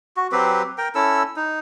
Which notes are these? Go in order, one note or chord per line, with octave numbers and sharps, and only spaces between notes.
F#4
F#3 C4 G4 B4
A#4 G5
C#4 E4 A4 E6
D#4